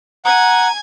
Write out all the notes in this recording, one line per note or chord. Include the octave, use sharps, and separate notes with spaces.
F#5 G#5 A#5 G#6